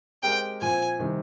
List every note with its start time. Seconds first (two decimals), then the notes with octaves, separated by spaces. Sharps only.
0.23 G#3 C4 G4 A#4 G5
0.61 A#2 F3 C4 G#5
0.99 C3 D#3 G3